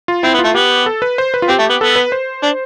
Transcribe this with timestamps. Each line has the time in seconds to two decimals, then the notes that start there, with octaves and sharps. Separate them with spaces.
0.08 F4
0.23 C4 E4
0.34 B3
0.39 F4
0.44 A3
0.55 B3 G4
0.86 A4
1.02 B4
1.18 C5
1.34 B4
1.42 F4
1.49 C4 G4
1.59 A3
1.70 B3
1.81 B3 A4
1.96 B4
2.12 C5
2.43 D4